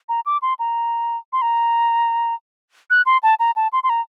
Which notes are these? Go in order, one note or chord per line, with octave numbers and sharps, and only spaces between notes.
A#5
D6
C6
A#5
C6
A#5
F#6
C6
A5
A#5
A5
C6
C6
A#5